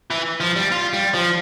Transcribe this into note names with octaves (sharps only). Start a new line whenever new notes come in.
E3
F3
G3
F4
G3
F3